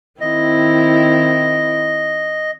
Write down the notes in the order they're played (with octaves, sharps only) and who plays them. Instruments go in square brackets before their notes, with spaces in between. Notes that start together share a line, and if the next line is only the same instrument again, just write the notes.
[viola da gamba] D#3 C4 E4 [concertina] D#5